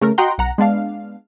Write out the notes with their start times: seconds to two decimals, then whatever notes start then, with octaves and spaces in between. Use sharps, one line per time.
0.01 C#3 A3 A#4
0.18 F#4 D#5 F#5 G5 A#5 C6
0.38 B1 F#5 A#5
0.58 G#3 B3 D4 F5